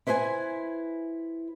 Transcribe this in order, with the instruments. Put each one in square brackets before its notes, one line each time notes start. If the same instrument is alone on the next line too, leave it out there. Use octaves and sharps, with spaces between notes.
[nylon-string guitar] E4 B4 C5 D#5 G#5